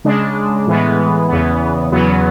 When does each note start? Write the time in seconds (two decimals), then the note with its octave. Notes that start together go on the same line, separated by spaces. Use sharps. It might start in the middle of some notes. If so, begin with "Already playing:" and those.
0.04 C#3 G#3 D4
0.67 A2 E3 G#3 B3
1.29 E2 C#3 E3 B3
1.92 E2 C#3 F#3 B3